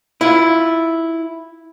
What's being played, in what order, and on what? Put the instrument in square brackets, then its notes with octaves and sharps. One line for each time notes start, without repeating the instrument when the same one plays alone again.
[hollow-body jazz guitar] E4 F4